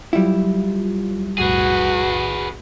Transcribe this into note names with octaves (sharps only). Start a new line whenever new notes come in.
F#3 G3 E4 F4
B1 F2 A2 F#4 G#4 B4